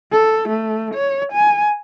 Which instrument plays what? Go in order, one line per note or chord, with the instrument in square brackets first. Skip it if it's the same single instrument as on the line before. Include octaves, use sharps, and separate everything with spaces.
[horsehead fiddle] A4
A3
C#5
G#5